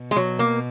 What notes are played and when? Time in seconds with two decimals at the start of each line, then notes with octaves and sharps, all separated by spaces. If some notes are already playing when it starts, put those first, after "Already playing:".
Already playing: B2
0.11 G#3
0.16 F#3
0.39 A#3